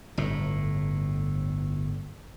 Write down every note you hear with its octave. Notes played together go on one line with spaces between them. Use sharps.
G1 A2